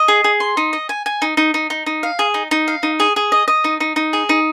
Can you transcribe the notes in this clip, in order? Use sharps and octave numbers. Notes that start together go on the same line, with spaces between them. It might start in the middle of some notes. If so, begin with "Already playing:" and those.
Already playing: D#5
G#4
G#4
C6
D#4
D#5
G#5
G#5
D#4
D#4
D#4
D#4
D#4
F5
G#4
D#4
D#4
F5
D#4
G#4
G#4
D#5
D#5
D#4
D#4
D#4
G#4
D#4